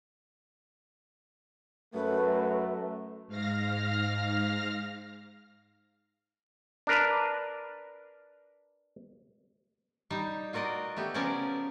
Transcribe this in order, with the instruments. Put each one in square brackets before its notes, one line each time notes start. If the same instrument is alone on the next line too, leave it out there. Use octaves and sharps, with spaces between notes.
[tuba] F#2 [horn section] A3 [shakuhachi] B4
[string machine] G#2 F5 F6 A#6
[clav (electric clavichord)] D4 A#4 B4
[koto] G3 D#4 G4
F4 F#4 A#4 D5 D#5
A3 B3 G4
C#3 F3 B3 C#4 A#4 D5